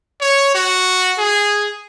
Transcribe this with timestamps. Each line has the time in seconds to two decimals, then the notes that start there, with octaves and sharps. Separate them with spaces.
0.21 C#5
0.55 F#4
1.18 G#4